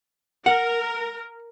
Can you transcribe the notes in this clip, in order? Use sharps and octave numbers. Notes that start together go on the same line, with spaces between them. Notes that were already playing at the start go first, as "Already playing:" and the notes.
A#4 F#5